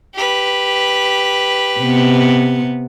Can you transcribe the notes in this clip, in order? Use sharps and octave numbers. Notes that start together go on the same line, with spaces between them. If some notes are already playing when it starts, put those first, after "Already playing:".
G4 B4
C3 B3